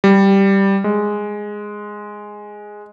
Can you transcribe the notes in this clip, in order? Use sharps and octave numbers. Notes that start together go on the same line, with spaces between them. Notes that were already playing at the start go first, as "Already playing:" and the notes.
G3
G#3